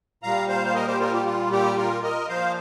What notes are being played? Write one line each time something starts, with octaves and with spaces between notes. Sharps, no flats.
A#2 G3 F5 A#5
C5 F5
F5
A#4 D#5
G4 C5
F4 A#4
G4
F4
G4
F4 A#4
A#4 D#5
A#2 F3 C5 F5